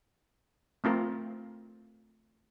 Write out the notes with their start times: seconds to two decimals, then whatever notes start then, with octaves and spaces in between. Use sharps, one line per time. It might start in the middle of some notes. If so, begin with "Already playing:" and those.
0.84 A3 C4 F4 A#4